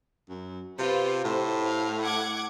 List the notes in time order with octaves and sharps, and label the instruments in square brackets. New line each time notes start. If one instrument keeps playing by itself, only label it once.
[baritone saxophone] F#2
[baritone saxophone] C3 [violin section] F4 B4 C5
[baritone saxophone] A2 [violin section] C5
[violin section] F5
F#5 D6 G#6